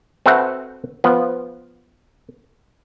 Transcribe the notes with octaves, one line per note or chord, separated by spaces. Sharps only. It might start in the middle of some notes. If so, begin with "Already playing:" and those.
C4 F#4 A4 B4 E5 F#5
F3 B3